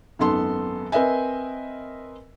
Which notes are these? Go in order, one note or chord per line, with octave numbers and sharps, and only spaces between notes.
G#1 F#2 B3 A4 C6
C4 A#4 B4 D#5 E5 G#5